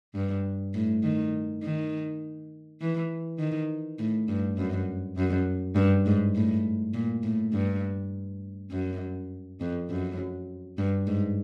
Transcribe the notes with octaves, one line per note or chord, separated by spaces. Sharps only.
G2
A2
D#3
D#3
E3
D#3
A2
G2
F#2
F#2
G2
G#2
A2
A#2
A2
G2
F#2
F2
F#2
G2
G#2